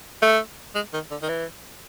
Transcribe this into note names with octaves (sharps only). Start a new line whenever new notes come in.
A3
G#3
D#3
D3
D#3
E3